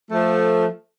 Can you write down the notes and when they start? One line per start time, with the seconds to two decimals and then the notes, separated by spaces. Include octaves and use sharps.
0.11 F3 A3